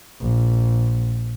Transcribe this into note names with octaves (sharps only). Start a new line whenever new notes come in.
A#1